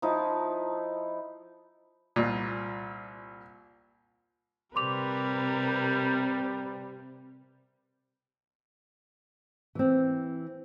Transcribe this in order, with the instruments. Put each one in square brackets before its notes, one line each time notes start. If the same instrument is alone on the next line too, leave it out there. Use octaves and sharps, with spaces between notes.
[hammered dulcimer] F3 D#4 E4
[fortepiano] C2 A#2
[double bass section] C3 C4 [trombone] G3 [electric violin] A#4 B4 [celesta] C6 D6 F7
[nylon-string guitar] E3 C4